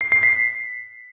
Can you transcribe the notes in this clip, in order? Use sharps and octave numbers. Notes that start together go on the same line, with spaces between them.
C7
C7
B6